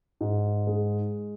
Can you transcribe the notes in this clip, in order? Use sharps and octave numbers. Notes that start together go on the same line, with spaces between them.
G#2
G#3